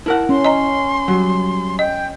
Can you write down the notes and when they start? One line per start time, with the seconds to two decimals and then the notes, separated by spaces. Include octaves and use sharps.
0.06 E4 A#4 F#5 A5
0.29 C#4 C6
0.44 D#5 A#5
1.08 F#3 G3
1.79 D#5 G5